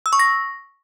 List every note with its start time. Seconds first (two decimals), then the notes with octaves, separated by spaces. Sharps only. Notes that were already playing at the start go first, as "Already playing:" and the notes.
0.06 E6
0.13 C#6
0.19 A#6